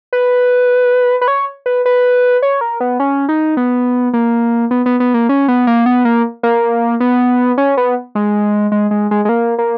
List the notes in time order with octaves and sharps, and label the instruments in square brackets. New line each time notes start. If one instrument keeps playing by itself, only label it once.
[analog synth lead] B4
B4
C#5
B4
B4
C#5
A#4
B3
C#4
D#4
B3
A#3
B3
B3
B3
A#3
C#4
B3
A#3
B3
A#3
A#3
B3
C#4
B3
G#3
G#3
G#3
G#3
G#3
A#3
A#3